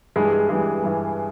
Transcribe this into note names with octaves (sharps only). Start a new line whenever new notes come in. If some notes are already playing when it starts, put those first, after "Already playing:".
G2 E3 G3 G#3 G#4
G#3 G#4
G2 E3 G3 G#3 G#4
G2 E3 G3